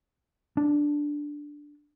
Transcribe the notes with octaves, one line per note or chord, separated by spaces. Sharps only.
D4